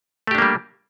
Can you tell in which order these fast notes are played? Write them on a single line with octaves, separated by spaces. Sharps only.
A3 G4 D4 A#3 G3